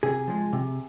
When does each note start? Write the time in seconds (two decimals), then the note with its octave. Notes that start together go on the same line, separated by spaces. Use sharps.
0.03 C3 G#4
0.28 F3 G#3
0.53 C3